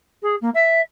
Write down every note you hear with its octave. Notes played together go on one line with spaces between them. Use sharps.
G#4
A#3
E5